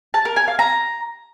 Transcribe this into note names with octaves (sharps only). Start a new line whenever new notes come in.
A5
A#4
G#5
F5
A#5